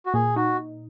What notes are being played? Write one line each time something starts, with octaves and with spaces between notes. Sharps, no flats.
F#4
A#2 G#4
D#4 F#4